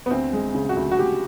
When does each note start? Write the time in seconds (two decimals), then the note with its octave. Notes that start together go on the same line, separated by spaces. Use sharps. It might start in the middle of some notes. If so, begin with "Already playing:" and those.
0.06 B3
0.11 D2 C4
0.33 G#3
0.55 C#3
0.69 F#4
0.76 D2
0.91 F#4
0.99 D2 G4